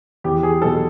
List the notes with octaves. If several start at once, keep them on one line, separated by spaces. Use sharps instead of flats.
E2 G4
G#4
B2 F#3 A4